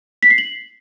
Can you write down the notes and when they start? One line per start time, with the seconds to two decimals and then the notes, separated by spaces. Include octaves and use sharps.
0.23 B6
0.30 C7
0.38 F#7